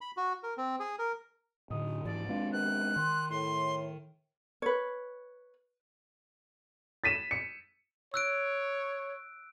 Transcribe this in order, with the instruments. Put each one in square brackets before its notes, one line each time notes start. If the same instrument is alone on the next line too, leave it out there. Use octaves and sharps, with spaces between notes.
[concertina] B5
F#4
A#4
C4
G#4
A#4
[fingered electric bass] A2 D3 [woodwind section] D#4 D#6
[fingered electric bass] G#2 E3 [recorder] D5
[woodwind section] B2 F4 [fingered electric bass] G#3 C4 D4
[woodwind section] C3 D#3 B3 [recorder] F#6
[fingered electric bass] D#3 [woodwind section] C6
[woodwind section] A2 [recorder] C6
[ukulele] B4 C#5
[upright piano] A6 B6 D#7 E7
C#7
[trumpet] C#5 [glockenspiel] E6 F#6 D7